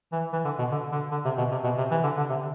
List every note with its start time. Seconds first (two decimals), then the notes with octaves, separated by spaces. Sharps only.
0.12 E3
0.33 E3
0.45 D3
0.59 B2
0.72 D3
0.92 D3
1.12 D3
1.25 C3
1.38 B2
1.52 C3
1.64 B2
1.78 C3
1.91 E3
2.04 D3
2.18 D3
2.30 C3